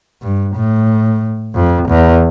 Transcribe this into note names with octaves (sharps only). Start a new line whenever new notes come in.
G2
A2
F2
E2